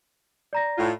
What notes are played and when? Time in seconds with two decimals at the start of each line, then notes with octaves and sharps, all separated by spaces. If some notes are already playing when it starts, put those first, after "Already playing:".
0.53 D5 A#5 A#6
0.78 A2 F4